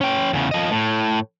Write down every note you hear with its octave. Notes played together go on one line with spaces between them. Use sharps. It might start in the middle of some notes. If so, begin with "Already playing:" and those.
C#4 G5
E2 C#3
F3 D#5
A2